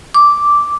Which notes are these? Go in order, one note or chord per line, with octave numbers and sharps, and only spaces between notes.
D6